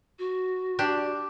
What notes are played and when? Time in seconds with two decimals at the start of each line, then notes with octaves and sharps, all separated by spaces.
0.19 F#4
0.79 D4 G4